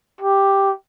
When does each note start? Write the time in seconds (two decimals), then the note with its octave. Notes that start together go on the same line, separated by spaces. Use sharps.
0.21 G4